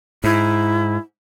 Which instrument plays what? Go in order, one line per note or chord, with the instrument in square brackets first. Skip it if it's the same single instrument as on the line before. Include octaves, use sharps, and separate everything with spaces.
[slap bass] G#2 [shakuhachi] E4